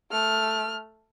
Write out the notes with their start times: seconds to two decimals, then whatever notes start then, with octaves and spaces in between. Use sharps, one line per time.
0.11 A3 F6